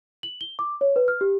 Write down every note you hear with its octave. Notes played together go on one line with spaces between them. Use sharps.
F#7
G7
D6
C#5
B4
F6
G4